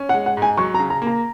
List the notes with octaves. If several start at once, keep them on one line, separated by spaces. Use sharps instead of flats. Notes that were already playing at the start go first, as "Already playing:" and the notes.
Already playing: C#4
F#5
G#3
F#5
G#2
G#5
F#3 C#6
A#5
C#3
A#5
A#3
A#5